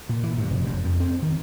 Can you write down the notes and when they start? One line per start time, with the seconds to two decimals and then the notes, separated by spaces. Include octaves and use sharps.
0.09 A#2
0.23 E3
0.38 G2
0.51 F1
0.66 F#2
0.84 F2
1.00 C4
1.23 D#3